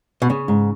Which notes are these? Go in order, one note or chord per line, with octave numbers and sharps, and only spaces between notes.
B2
C#3 C#4
G#2